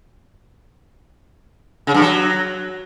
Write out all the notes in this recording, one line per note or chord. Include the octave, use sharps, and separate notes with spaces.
C#3
G2
F#3